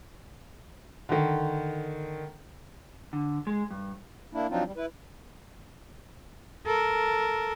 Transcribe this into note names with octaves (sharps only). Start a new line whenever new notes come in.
D3 D#3
D3
G#3
G2
A#3 D4 E4
F3 F#3 C4 D4 D#4 F4
G3
E4 B4
A4 A#4